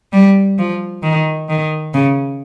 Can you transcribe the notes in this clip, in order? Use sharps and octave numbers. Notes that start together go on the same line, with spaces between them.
G3
F3
D#3
D#3
C#3